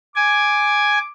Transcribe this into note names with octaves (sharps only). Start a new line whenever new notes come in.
G#5 D6